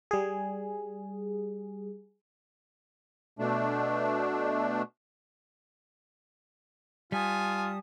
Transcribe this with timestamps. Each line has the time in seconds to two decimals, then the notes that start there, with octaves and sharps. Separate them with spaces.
0.11 G3 G#4
3.39 B2 A3 D4
7.12 G3 F4 G#5 A5 D#6